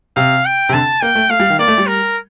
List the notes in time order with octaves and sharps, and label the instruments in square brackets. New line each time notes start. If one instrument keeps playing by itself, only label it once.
[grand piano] C3 [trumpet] F5
[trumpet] G5
[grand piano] C3
[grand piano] D3 [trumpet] A5
[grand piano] A#3 [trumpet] G5
[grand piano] A3
[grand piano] A3 [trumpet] F5
[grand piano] G3
D#3
[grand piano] A#3 [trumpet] D5
[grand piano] A3
G3
[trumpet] A#4